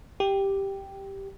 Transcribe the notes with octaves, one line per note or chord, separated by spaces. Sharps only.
G4